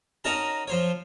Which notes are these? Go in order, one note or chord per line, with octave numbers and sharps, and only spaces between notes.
C#4 D#4 F#4 A#4 A5 A#5
F3 C5 C#5